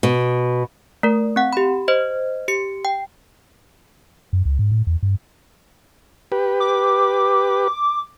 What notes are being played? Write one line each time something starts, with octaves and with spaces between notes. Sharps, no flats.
B2
A3 A#4
C4 F#5
G4 B5
C5 D#5
G4 C#7
G5
F#2
C#2
G#2
A2
E2
G2
G4 B4
D6